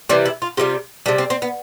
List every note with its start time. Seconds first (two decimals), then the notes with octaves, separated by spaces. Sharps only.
0.09 C3 E3 G3 C4
0.26 E4
0.42 F4
0.57 C3 E3 G3 F4
1.06 C3 E3 G3 D4
1.18 C4
1.30 C4
1.42 B3